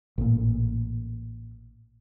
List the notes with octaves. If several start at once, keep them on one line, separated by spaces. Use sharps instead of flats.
A1 A#2